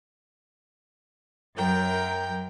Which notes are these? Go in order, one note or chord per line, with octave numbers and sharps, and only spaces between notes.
F#2 F#3 A#4 G5 G6